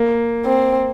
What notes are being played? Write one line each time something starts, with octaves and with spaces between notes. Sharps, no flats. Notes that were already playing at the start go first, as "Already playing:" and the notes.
Already playing: A#3
C4